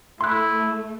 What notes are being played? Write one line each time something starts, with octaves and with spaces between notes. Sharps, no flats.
A3 E4 C6 F#6